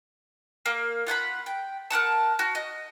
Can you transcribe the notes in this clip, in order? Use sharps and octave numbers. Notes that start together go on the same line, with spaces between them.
A#3
F4 F#5 G#5 B5
G5
A#4 D5 F#5 A5
F#4
D#5